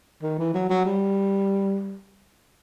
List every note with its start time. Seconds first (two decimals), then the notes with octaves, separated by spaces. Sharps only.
0.22 D#3
0.38 E3
0.54 F#3
0.69 F#3
0.85 G3